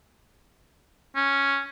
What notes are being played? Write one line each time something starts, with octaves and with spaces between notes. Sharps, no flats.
C#4